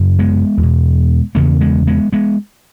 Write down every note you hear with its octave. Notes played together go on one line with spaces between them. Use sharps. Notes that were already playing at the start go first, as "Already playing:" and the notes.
Already playing: F#2 C#3
G#3 B3
E2
B2
E2 C#3 A#3 C#4
G#3 B3
G#3 B3
G#3 B3